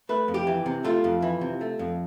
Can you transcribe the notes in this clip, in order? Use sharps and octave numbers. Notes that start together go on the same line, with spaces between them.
A3 B4
F2
G4
E3
C3
A3 F4
F2
E3
C3
A3
F2